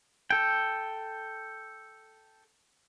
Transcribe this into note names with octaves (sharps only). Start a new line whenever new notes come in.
A4 G5